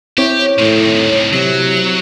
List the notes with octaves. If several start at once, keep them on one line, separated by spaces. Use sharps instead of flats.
C4 E4 G4 C#5
A2 C3 D#3
C3 F#3